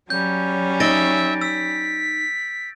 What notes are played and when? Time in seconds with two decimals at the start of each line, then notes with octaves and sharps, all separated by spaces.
0.10 F#3 G3 C#4 G6
0.80 D#4 D#5 E5 A6 A#6 D7
1.41 E6 B6